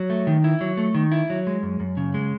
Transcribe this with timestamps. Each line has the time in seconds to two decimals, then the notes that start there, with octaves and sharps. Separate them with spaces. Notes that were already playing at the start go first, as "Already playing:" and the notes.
Already playing: F#3
0.10 A3
0.27 D#3
0.44 E4
0.61 F#3
0.77 A3
0.95 D#3
1.12 E4
1.30 F#3
1.47 G#3
1.63 F#2
1.80 F#2
1.97 C#3
2.14 G#3